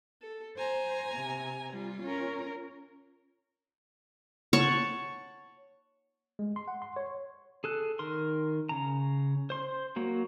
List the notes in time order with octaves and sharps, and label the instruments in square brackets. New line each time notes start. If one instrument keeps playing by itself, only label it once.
[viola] A4
[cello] C5 [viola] G#5 A#5
[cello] C3
[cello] G3 [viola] F4
[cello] C#4 A#4
[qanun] C#5 F#5 A5 C#6
[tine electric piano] G#3
C6
F#5
C6
C#5
[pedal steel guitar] G#4 A4 F#6
D#3 A#4 C6
C#3 A#5
C5 C6
F#3 A#3 F#4